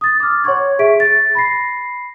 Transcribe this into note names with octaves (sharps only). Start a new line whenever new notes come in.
D#6 A6
D6 F6
C#5 F#5 C6 C#6 G#6
G#4 E5 C#6 B6 D7
A6
B5 A#6 C7